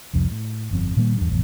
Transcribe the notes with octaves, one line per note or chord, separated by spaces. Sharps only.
F1 C2 F2
A2
G1 F2 C4
A#2 D#3 G3 A#3
E2 G2
A1 F2 B2